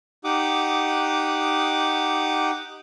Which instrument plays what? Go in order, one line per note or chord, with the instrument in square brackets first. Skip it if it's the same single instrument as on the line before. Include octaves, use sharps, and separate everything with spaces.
[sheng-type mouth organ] D#4 G4 F#5 D6 D#6